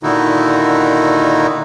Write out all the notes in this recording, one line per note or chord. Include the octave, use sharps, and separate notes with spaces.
A#2 D3 D#3 D#4 E4 F#4